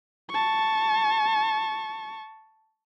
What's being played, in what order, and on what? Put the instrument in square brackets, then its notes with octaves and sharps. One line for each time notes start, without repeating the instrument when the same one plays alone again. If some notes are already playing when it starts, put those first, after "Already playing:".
[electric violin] A5 C#6